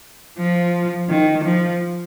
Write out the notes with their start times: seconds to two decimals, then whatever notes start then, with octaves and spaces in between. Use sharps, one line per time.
0.38 F3
1.09 D#3
1.44 F3